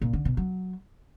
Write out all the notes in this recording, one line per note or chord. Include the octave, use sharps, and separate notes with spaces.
A#2
D3
B2
F#3